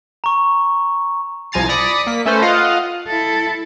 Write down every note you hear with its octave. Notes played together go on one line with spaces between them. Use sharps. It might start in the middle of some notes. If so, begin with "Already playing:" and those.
A#5 C#6
C2 F3 G#5 A#5 A6 C7
D5 B5 D#6 A#6 C#7
A#3 B6
A3 C#4 A4 B4 C5
F4 D#5 F5 F#5
E4 A4